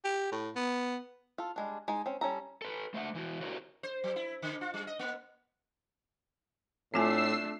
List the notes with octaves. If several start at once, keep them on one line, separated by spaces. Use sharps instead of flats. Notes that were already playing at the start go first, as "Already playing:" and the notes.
G4
A2
B3
F4 A4
G3 G#3 D4
G#3 D#4 G#5
C4 C#4
G3 C#4 A4 A#5
A4 B4
A3 C5 E5 F#5
E3 E4 F#4
E4 F#4 G4 A#4 C5 C#5
C5
F#3
E4
D3
F4
G3
D#5
A#3
A2 A3 C4 D4 F4 G#5 E6 C7